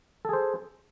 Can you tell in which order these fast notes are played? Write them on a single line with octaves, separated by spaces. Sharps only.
A4 G#4 C5